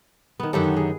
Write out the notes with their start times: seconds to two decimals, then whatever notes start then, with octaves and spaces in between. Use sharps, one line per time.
0.40 D#3 B3
0.53 F#2 D3 D#3 B3 G4 A4
0.76 G#4